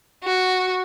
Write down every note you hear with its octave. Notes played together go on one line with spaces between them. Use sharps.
F#4